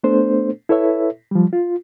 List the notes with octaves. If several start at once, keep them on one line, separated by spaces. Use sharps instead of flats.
A3 B3 D4 A4 C5
E4 A4 B4 C#5 E5
F3 G3
F4